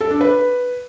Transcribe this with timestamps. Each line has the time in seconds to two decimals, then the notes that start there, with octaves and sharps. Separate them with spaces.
0.01 A4
0.11 D4
0.21 B4